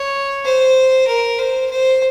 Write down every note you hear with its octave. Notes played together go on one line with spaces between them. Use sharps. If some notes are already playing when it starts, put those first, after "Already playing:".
Already playing: C#5
C5
A#4
C5
C5